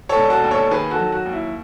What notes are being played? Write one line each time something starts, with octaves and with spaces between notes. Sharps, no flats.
A4 C#5
E1
F#4 A4
D#2
A4 C#5
D#3 G#4 B4
F#4 A4
F#3
F#4
D#2
E4